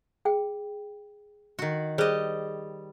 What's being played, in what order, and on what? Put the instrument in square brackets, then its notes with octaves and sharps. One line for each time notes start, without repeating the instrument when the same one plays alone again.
[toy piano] G#4 G5
[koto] D#3 F#4
[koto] G3 D#5 [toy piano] G#4 C5